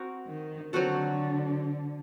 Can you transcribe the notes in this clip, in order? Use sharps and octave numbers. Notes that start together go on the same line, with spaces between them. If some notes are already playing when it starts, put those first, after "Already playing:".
Already playing: C4 F#4 A#4
D#3
D3 F#3 C4 F#4 A4